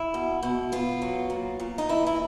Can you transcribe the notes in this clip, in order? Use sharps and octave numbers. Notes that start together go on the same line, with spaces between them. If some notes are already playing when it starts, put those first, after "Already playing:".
Already playing: E4
B2
B2
B3 F4
F#3
A#2
A#2
D#4
E3 E4
E4